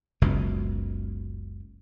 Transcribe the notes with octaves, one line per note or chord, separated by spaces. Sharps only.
F#1 C#2 B2